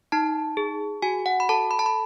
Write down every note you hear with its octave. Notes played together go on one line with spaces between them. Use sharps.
D#4 A5
G#4
F#4 G#5
F#5
B5
A4 A5
B5
A5
B5